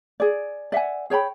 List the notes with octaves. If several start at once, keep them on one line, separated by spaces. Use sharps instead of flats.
G#4 D5
D5 E5 F#5 G#5
G#4 C#5 G5 B5